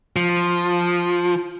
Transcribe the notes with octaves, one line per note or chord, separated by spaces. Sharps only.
F3